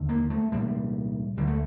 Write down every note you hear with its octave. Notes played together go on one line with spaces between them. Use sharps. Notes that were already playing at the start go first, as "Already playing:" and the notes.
Already playing: D#2 D3
A#3
A3
C2 A#2 G3
D2 D3 G3
A3